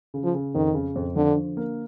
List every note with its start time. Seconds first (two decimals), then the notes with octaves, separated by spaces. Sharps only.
0.14 C#3
0.23 F3
0.34 C#3
0.55 F2 D#3
0.74 C#3
0.96 F2
1.16 D3 F3
1.36 D3
1.57 A#3